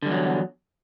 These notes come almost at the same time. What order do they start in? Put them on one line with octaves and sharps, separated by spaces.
D3 G3 E2 F#3